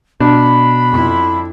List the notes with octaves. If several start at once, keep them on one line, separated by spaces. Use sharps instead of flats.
B2 D4 B5
F2 E4